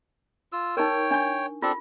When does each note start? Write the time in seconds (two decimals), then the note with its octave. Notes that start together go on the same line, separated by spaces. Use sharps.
0.52 F4 E6
0.77 D#4 A#4 C#5 G5
1.11 D4 C#6
1.62 C4 D4 F4 A4